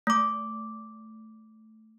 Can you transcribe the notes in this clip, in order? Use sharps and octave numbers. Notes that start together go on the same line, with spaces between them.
A3 D6